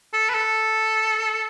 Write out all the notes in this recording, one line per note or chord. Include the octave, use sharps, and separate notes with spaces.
A4
B4
A4